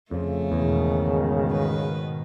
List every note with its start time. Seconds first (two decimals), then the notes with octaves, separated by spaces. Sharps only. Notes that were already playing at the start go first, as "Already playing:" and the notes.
0.11 F2 C#3 F3 A3
0.52 E2 G#2 B2 D#3
1.52 B4